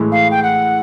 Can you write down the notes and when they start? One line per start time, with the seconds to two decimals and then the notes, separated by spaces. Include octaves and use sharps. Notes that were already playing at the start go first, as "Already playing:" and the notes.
Already playing: A2 E3 G#3
0.12 F5
0.31 G5
0.43 F#5